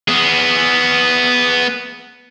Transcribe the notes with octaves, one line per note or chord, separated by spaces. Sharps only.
B3 G#4